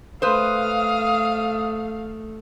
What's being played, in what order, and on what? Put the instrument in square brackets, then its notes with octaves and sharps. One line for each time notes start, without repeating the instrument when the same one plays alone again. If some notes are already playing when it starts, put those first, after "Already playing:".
[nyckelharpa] A3 [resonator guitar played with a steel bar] B4 C5 [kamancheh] F5 [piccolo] D#6